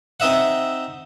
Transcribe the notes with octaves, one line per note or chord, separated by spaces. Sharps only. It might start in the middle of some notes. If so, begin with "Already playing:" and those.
C4 D#4 D#5 E5 F#5